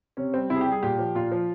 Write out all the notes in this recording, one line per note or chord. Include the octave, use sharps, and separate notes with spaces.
C3 C#4
G3 C4
C3 E4
G#4
G3 G4
G#4
A#2 G4
F3
A#2 F4
F3